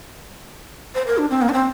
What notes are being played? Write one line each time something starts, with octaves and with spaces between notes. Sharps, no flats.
C5
A#4
D4
C4
A#3
D4
C4